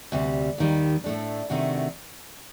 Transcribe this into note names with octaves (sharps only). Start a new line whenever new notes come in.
D2 C3 G3
D#2 D#3 G3
A2 A3 D4
C3 D#3 A3 D4 F#4